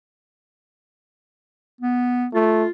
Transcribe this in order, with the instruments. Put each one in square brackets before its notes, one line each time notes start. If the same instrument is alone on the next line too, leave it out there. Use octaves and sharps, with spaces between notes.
[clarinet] B3
[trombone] A3 [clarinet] F4